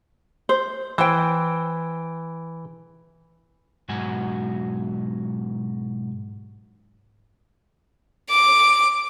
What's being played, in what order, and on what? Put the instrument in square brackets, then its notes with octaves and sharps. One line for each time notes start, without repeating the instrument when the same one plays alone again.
[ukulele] C5
[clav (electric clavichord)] E3 [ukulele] C5 G5
[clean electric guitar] B1 G#2 F#3 F#4 G#5
[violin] D6